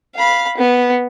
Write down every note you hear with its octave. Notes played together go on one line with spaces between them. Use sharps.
F5 B5
B3